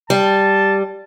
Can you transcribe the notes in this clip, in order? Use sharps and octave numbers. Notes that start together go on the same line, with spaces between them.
G3 A5